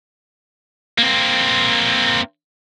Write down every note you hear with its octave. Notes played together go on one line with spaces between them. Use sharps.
A#3 C4